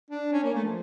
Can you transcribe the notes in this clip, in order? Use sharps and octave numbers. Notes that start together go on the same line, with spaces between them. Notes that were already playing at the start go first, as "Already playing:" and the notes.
D4
C#4
A#3
A3
F3